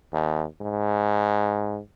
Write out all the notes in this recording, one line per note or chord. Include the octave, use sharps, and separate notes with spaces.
D#2
G#2